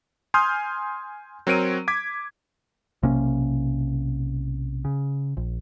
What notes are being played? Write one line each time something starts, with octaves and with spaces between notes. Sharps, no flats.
G#5 C6 D#6 F6 G6
F#3 C4 A#4 C#5 D7 D#7
D6 G#6 B6
B1 C3 A#3 C#4
C#3
A#1